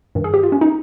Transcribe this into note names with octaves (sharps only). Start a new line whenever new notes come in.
G2 D#3
G#4
G4
F4
C#4
D#4